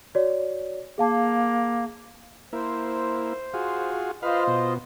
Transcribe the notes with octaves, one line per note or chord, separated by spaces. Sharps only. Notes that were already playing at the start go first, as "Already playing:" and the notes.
F#4 C#5 D5
A#3 G#4 F5 A5
A#3 E4 C5
F4 F#4 G#4
F4 B4 C5 D#5 F5
B2